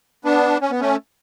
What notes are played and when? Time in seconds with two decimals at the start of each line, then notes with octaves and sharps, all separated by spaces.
0.24 B3 D4
0.61 C#4
0.71 B3
0.80 A3 C#4